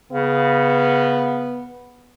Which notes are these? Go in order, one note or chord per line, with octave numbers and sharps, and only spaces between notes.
C#3 B3